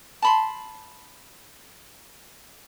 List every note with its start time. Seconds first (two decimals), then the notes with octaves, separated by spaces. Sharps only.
0.22 A5 B5 C6